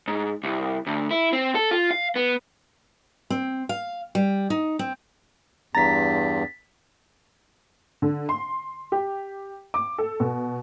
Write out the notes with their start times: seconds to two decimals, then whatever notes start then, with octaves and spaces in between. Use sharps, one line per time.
0.08 G#2
0.44 C2
0.87 D2
1.11 E4
1.33 C4
1.55 A4
1.71 F4
1.91 F5
2.16 B3
3.30 C4
3.69 F5
4.15 G3
4.50 D#4
4.79 C4
5.75 E2 G2 A#5 A6 B6
8.02 D3
8.29 C6
8.92 G4
9.74 D6
9.98 A4
10.20 B2